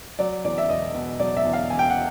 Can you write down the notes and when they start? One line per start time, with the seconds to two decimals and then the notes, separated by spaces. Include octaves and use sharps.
0.19 F#3 D5
0.44 E2 D5
0.58 E5
0.69 E1 D#5
0.94 B2
1.20 F#3 D5
1.37 E5
1.45 E2
1.53 F5
1.69 E1 G#5
1.79 G5
1.90 F#5